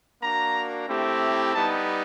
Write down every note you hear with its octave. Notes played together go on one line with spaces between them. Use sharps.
A#3 D4 F#4 A#5
A3 C4 E4 G4
G3 B3 D#4 A5